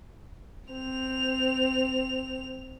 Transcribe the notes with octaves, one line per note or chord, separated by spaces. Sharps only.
C4 F7